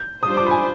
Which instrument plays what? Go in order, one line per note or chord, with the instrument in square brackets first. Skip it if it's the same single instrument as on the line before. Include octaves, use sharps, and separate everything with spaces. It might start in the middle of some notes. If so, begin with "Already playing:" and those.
Already playing: [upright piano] G6
[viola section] G3 D4 F4 C5 [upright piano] D#6
[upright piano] D6
B5
G#5